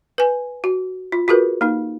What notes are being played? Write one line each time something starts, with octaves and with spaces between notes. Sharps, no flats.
B4 G#5
F#4
F4
F4 F#4 G#4 A#4 B4
A#3 D#4